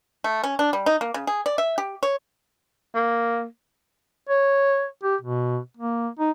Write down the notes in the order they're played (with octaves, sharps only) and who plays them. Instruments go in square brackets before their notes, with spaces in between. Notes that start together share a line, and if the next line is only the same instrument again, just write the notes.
[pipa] A3
C#4
D4
G3
D#4
A#3
C#3
G#4
D5
E5
G4
C#5
[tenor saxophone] A#3
[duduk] C#5
G4
B2
A#3
D#4